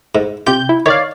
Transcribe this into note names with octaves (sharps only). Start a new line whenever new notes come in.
G#2
C3 F4 G4 G6
E4
D#3 C#5 D5 F5